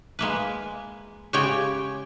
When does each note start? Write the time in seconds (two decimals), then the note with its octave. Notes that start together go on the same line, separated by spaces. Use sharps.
0.19 G#3 A#3 B4
1.33 C#3 G#3 G4 C#5 G5